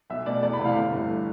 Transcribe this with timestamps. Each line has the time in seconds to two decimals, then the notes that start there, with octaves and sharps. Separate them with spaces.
0.10 B1 E5
0.26 B2 A3 D5
0.43 E2 D5
0.53 B5
0.59 C3 E3 A3
0.65 F5
0.76 G1
0.92 G2 E3 A3